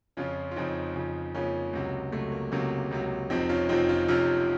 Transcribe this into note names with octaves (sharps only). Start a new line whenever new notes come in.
F2 C#3 F3 C#4 F4
F4
F2 C#3 F3 C4 D#4
F2 C#3 F3
F2 C#3 F3 A#3 C#4
C#2 C3 F#3
C#2 C3 F#3 A3
A#3
C#2 C3 F#3 A#3 C#4
C#2 C3 F#3
F1 F2 C3 F3 C4 D#4
C#4 F4
F1 F2 C3 F3 C4 D#4
C#4 F4
F1 F2 C3 F3 C#4 F4